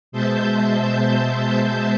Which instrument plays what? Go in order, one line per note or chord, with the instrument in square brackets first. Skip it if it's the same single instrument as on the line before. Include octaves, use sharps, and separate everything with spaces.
[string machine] B2 G#3 C5 E5 A5 G6